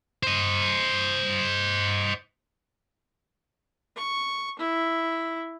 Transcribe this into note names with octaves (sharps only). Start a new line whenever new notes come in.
C5 D#5
C#6
E4